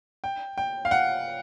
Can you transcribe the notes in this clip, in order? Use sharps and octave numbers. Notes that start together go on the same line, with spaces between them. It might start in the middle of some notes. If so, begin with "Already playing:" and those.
G5
G5
F5
F#5